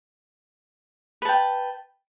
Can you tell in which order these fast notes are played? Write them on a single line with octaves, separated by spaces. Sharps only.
B4 A5 G5